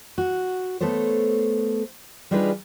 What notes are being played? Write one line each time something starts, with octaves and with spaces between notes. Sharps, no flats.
F#4
A3 B3 A4 C5 C#5
G3 D4 D#4 F4 G#4 B4